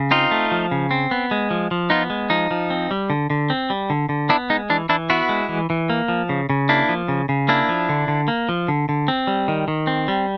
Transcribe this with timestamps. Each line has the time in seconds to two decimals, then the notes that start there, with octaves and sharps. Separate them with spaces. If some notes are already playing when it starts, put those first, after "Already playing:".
Already playing: C#3
0.11 C4 D#4 F4
0.31 A3
0.52 F3
0.71 C#3
0.91 C4
1.11 B3
1.31 G#3
1.51 F3
1.71 F3
1.90 B3 D#4 F4
2.10 G#3
2.30 F3 D#4
2.51 F3
2.70 C4
2.91 G3
3.10 D3
3.30 D3
3.50 C4
3.70 G3
3.90 D3
4.09 D3
4.29 B3 D4 E4
4.50 G#3 D#4
4.70 E3 D4
4.89 E3 D4 E4
5.10 B3 E4 F#4
5.29 G#3
5.49 E3
5.70 E3
5.90 A#3
6.08 F3
6.29 C#3
6.50 C#3
6.69 A#3 D4 E4
6.89 F3
7.08 C#3
7.29 C#3
7.48 A#3 D4 E4
7.69 F3
7.89 D3
8.08 D3
8.28 A#3
8.49 F3
8.68 D3
8.89 D3
9.08 C4
9.27 G3
9.48 D#3
9.68 D#3
9.87 C4
10.08 G3